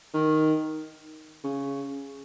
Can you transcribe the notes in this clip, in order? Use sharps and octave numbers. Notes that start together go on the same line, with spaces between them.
D#3
C#3